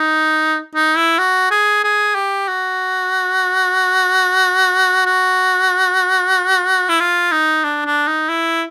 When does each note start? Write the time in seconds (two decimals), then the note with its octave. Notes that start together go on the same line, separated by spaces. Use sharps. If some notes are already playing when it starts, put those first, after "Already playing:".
Already playing: D#4
0.75 D#4
0.97 E4
1.19 F#4
1.51 G#4
1.84 G#4
2.15 G4
2.49 F#4
5.06 F#4
6.89 E4
7.00 F4
7.32 D#4
7.64 D4
7.86 D4
8.07 D#4
8.29 E4